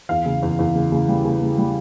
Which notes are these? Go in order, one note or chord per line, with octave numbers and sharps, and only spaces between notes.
E2 F5
C#3
E2
E2
C#3
C#3
G3
C#3
C#3
G3